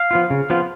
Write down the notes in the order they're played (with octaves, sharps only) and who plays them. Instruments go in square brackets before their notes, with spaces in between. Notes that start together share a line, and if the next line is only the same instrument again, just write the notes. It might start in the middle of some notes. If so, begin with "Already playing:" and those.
Already playing: [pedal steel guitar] F5
F3 B3 F4
C#3
F3 B3 F4